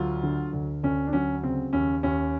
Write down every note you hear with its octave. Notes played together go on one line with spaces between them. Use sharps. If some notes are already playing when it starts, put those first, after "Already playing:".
Already playing: D2 F#3 F4
D3
D2
D2 C#4
D4
F#3 C#4
C#3 C4
D#2 C#4
D#2 C#4